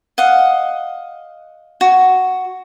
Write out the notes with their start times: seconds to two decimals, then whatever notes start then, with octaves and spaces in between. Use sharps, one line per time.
0.18 D#5 F5 F#5
1.81 F#4